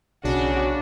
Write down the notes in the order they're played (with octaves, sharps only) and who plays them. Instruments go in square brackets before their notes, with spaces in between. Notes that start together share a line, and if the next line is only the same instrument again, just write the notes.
[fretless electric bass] B1 [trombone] C#3 [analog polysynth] D4 [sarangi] F#4